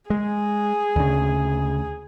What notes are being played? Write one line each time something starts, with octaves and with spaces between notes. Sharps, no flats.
G#3 G#4
D2 C#3